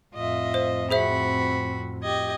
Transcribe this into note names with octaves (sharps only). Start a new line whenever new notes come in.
F2 A2 F4 D#5 E5
C5
C4 F#4 G#4 C5 E5 B5
G4 D#5 G#6